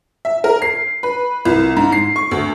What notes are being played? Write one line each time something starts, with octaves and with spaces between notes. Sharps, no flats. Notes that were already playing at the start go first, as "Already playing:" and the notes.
E5
A#4
C7
B4
C2
G#2
C7
C#6
D2